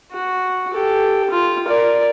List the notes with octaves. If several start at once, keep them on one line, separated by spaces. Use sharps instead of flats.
F#4
G4 A4
F4
A#4 D5